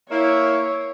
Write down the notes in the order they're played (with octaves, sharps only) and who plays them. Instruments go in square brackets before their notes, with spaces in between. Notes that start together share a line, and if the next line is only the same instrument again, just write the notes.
[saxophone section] A#3 E4 [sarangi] C#5